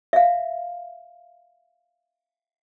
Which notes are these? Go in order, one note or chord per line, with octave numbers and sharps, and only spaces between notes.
E5 F5